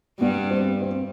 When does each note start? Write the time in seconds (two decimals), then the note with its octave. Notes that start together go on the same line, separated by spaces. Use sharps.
0.20 G2 G3 B3
0.50 C4
0.81 C4